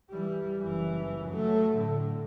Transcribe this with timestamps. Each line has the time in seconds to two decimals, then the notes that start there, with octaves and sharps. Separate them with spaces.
0.10 E3 G3
0.61 F#1 E3
1.28 F#3 A3
1.76 A2 D3